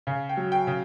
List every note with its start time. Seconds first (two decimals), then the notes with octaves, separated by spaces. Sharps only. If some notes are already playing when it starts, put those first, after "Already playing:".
0.07 C#3
0.29 G5
0.37 F#3
0.52 G5
0.67 C#3